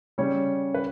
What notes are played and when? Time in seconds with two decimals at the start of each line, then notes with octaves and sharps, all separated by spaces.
0.18 C#3 G3 C#4 C#5
0.74 B4